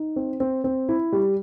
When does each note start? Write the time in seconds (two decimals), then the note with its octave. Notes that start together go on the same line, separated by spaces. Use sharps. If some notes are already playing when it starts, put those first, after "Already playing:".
Already playing: D#4
0.16 C4
0.40 C4
0.64 C4
0.89 E4
1.12 G3